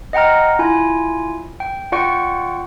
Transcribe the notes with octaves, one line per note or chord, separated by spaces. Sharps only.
D#5 F#5 G5 A#5 F6
E4 F4 G#5
G5
F4 D5 F#5 G5 C#6